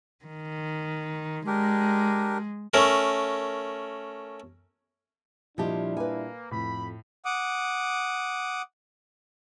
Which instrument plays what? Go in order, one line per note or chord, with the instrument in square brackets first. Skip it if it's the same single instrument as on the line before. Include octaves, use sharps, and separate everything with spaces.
[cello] D#3
[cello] G#3 [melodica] D4 G4 A#4
[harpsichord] A3 C#4 A#4
[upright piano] A#2 D#5 A5 [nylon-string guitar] F3 G4 [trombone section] G3 D4 E4
[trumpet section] A#3 [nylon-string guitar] B4 G#5
[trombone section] F2 [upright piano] A2 [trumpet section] B5
[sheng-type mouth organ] F#5 D6 D#6